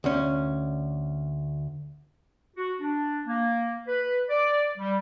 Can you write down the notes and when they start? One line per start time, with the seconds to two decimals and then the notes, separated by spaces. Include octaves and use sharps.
0.04 D2 C#4
2.56 F#4
2.81 D4
3.27 A#3
3.88 B4
4.30 D5
4.78 G3